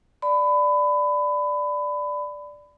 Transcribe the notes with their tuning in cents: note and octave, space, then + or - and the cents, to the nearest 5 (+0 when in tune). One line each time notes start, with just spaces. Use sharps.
D5 +0 B5 +25